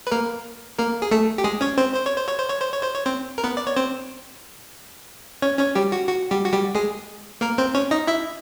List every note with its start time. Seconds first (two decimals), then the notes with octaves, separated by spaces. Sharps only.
0.07 B4
0.11 A#3 A#4
0.78 A#3 A#4
1.02 G#4
1.11 A3 A4
1.38 G4
1.44 G#3 G#4
1.61 C#4 C#5
1.78 C4 C5
1.94 C5
2.06 C#5
2.16 C5
2.28 C#5
2.38 C5
2.50 C#5
2.61 C5
2.72 C#5
2.83 C5
2.94 C#5
3.06 C4 C5
3.38 A#4
3.44 B3 B4
3.57 D5
3.67 C#5
3.76 C4 C5
5.42 C#4 C#5
5.59 C#4 C#5
5.75 G3 G4
5.92 F#4
6.08 F#4
6.31 G3 G4
6.45 F#4
6.53 G3 G4
6.75 G#3 G#4
7.41 A#3 A#4
7.58 C4 C5
7.75 C#4 C#5
7.91 D#4 D#5
8.07 E4 E5